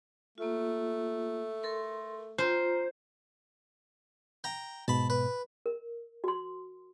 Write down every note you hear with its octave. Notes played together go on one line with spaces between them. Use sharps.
A3 A#3 F4
A4 A#4 C6
F4 C5 A#5
G5 A#5
G#2 B2 A5 B5
B4
A#4
F#4 C6